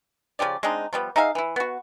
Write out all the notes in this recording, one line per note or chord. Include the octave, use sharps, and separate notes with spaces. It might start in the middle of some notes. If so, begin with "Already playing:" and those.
C#3 F3 G4 D5
G#3 C4 D4 D#4
F3 G3 B3
D#4 G#4 E5 F5
E3 E4
B3 F#4